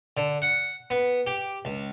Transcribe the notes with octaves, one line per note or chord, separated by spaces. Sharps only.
D3
F#5
B3
G4
C#2